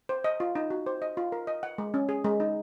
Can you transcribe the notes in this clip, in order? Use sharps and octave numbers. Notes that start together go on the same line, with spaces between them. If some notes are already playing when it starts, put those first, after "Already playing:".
C5
D#5
F4
D#4
F#4
C5
D#5
F4
A#4
D#5
F#5
G#3
C#4
G#4
G#3
D#4